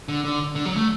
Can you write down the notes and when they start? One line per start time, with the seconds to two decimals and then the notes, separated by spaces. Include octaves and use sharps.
0.08 D3
0.24 D3
0.55 D3
0.65 F#3
0.76 A3